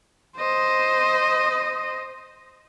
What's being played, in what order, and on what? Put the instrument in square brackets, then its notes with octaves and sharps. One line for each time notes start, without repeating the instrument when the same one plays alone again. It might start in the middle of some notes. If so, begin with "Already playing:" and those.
[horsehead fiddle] C5 D#5